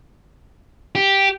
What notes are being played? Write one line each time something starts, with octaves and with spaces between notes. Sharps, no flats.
G4